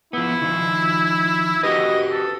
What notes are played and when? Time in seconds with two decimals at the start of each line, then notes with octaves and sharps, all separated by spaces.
0.13 F3 B3 E4
0.42 D#3 F3
1.63 F#4 G4 B4 D#5
2.10 A4